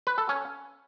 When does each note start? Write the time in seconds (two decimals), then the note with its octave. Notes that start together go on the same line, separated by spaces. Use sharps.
0.07 B4
0.18 A4
0.29 C#4